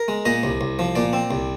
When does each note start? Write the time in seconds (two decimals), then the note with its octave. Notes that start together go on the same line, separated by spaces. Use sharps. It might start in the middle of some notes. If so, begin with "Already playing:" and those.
Already playing: A#4
0.08 G#3
0.25 A#2 D#5
0.43 C2
0.61 C2
0.79 F3
0.95 A#2 D5
1.13 C4
1.31 C2